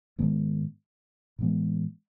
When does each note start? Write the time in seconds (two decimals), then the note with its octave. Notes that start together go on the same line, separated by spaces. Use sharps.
0.19 G#2 D#3 G#3 B3
1.39 A2 E3 G#3 B3